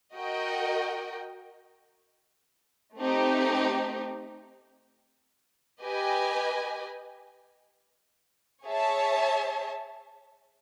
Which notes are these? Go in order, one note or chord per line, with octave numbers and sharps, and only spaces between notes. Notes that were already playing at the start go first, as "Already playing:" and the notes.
F#4 A#4 D#5 G5
A3 C4 D#4 G4
G4 B4 D#5 G#5
G#4 C#5 E5 A5